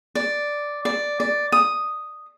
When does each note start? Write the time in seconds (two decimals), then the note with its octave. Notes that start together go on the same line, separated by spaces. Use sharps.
0.15 D5
0.85 D5
1.20 D5
1.52 D#6